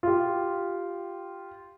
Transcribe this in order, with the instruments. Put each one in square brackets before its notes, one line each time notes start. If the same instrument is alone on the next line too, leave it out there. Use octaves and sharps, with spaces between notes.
[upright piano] F4 G4